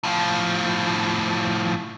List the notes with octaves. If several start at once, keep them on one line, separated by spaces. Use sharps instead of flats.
A2 F3